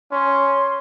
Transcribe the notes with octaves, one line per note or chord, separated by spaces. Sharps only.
C#4 C6